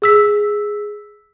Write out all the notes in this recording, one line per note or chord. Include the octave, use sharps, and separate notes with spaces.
G#4 E6 B6